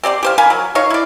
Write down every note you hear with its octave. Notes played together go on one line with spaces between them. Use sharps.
C4 G4 D5 C6
G4 C5 F5
A#4 F5 G#5 B5
F#3
D#4 C#5 F5
E4 D5